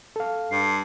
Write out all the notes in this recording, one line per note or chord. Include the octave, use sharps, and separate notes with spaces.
A4 F5
G2 C7